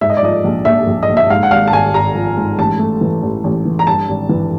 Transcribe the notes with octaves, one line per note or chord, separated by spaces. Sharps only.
G#2 E5
D#5
D5
F3 D#5
A#1
A#1 E5
A#1
D#5
A#1
E5
G#2 F5
F#5
G#1 F5
A5
G#1 G#5
G#1 A#5
F3
G#2
A1 A5
A3
E3
A1
A1
E3
A#5
G2 A5
G#1
E3